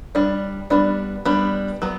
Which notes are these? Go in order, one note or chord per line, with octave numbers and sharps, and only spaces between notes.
G3 D4
G3 B3 D4
G3 B3 D4
F#3 B3